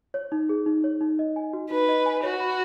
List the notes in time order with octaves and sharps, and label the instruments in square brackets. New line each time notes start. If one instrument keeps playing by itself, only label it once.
[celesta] C#5
D#4
G#4
D#4
C#5
D#4
D#5
G#5
F#4
[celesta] D#4 [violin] B4
[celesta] D#5
G#5
[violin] F#4 [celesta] C#5
[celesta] B5